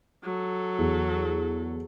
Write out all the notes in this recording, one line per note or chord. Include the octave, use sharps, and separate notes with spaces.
F#3 A4
E2